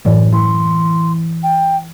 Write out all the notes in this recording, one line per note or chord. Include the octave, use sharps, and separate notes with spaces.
F#2 A2 E3 D5
E3 C6
G5